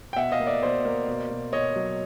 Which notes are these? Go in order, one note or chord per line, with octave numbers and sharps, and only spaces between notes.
G5
B2 E5 F#5
D#5 F5
A#3
D5 E5
B2 C5 D5
A#3
B2
B2
B2 C#5 D#5
F#3